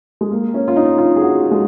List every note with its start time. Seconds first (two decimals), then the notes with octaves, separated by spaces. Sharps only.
0.21 G#3
0.31 A#3
0.54 C#4
0.68 F4
0.76 D#4
0.98 F4
1.16 G#4
1.22 F#4
1.51 G#3